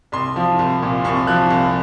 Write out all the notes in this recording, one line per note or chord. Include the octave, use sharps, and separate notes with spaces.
C2 C6
F3
C2
A#2
C2 C#6
F3 F#6
C2